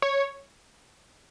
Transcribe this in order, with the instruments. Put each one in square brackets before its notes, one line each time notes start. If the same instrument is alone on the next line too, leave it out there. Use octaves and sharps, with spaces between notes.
[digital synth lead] C#5